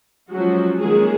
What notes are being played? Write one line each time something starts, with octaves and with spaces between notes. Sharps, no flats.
F3 F#3 G#3 C#4 F#4
D#3 G#3 A#3 C#4 G#4